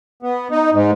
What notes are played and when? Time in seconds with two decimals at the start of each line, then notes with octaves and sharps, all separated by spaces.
0.23 B3
0.51 D#4
0.73 G#2